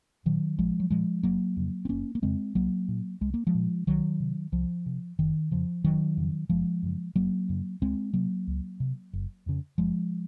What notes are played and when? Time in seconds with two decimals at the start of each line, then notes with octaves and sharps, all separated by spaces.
0.26 A#2 D#3 F#3
0.58 A#1 F3 G#3
0.80 F#3
0.90 A#2 F3 G#3
1.23 F#1 F#3 A#3
1.57 F2 C#3
1.85 C4
1.89 F#1 A#3 C#4
2.15 A#3
2.22 F2 C#3 G#3 C4
2.55 C2 F#3 A#3
2.88 A#2
3.21 C2 G#3
3.34 A#3
3.47 F3 G#3
3.55 A#2
3.87 C2 D#3 F#3
4.20 C3
4.52 C2 F3
4.86 C3
5.19 F#1 D#3
5.51 F2 C#3 F3
5.84 F#1 D#3 F#3
6.17 F2 C#3
6.49 F#1 F3 G#3
6.83 F#2 C#3
7.16 F#1 F#3 A#3
7.49 F#2 C#3
7.81 C#2 G#3 C4
8.14 C3 F#3 A#3
8.47 C#2
8.80 C3
9.13 F#1
9.46 F2 C#3
9.78 F#1 F3 G#3